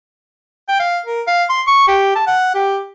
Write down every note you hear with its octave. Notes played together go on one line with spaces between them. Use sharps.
G5
F5
A#4
F5
C6
C#6
G4
A5
F#5
G4